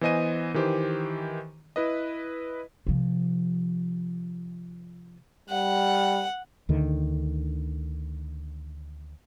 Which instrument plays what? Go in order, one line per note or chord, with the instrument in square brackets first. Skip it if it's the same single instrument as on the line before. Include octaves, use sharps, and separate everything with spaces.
[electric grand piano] E3 B3 C5 D#5 G#5 D#7
D#3 E3 G4 C5
E4 B4 D#5
[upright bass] C3 F3
[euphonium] G3 [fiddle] F#5
[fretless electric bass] D2 D3 D#3